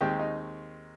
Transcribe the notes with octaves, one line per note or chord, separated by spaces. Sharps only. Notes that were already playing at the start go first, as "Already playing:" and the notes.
D#2 D#3 G#3 C4 G4
D#4